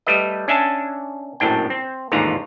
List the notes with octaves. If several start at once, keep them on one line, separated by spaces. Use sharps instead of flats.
G3 A3 B4 D#5
C#4 D4 E5 G#5 A5
A#1 F#2 A2 D4 G5
C4
A1 D#2 G#2 D3 F4 A#5